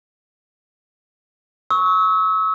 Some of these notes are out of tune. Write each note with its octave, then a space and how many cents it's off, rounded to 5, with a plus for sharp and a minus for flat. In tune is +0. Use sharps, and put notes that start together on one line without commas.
C#6 +0 E6 -35